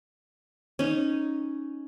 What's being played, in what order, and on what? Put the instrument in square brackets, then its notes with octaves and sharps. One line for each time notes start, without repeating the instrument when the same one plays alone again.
[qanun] C#4 D#4